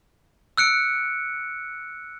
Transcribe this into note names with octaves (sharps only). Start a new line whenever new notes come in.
E6 F#6 C#7 D7